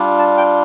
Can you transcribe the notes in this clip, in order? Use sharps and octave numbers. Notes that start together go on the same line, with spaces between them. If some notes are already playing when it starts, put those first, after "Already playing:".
Already playing: G3 D4 F4
A5
G5